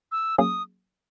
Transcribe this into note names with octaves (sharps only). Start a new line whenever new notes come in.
E6
F#3 A#3 C#4 G#4 D#6